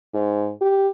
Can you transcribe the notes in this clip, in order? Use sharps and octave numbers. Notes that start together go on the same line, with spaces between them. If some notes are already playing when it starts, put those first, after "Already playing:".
G#2
G4